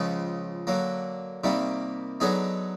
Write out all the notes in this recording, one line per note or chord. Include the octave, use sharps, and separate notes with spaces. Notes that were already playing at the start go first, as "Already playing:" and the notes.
Already playing: C#2 C#3 F3 G#3
D3 F#3 A#3
C3 D#3 G3 A#3
D3 F#3 B3 D#4 G#4